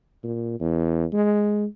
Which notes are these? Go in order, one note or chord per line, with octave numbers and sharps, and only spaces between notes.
A#2
E2
G#3